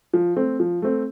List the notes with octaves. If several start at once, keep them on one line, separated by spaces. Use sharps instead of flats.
F3
A3 C4
F3
A3 C4